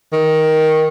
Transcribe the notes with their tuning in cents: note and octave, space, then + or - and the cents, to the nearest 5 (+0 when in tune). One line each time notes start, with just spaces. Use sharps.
D#3 +10